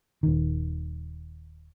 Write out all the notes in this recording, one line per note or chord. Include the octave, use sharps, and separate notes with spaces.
D#1 D#3